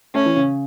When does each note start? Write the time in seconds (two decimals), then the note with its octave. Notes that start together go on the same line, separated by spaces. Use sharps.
0.15 A3 C#4
0.26 E3
0.37 C#3